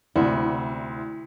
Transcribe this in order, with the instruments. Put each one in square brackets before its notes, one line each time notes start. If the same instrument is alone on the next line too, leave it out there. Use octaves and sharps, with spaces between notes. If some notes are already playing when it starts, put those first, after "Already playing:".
[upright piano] D2 C3 [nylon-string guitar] E4